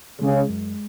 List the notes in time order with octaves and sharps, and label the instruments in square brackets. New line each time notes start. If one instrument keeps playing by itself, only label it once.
[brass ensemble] C#3 [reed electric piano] G#3
[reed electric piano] F#2